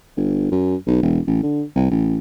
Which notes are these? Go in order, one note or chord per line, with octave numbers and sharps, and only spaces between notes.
G1
F#2
B1
E1
A1
D3
C2
A1